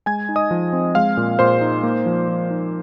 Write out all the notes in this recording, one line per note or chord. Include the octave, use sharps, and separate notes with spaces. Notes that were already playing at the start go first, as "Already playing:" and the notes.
G#3 G#5 G#6
D#4
D#5 D#6
F3
C4
G#3 F5 F6
A#2
A#2 C5 C6
D#4
A#3
F3
F3
D#4